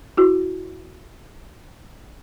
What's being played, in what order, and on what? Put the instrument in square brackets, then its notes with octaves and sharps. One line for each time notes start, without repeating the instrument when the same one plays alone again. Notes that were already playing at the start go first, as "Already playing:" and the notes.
[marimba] E4 F#4